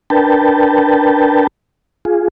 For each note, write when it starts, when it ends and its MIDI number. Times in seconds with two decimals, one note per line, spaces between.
0.10 1.47 62
0.10 1.47 70
0.10 1.47 71
0.10 1.47 79
0.10 1.47 81
2.05 2.28 65
2.05 2.28 68